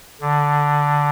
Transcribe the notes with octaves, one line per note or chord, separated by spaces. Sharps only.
D3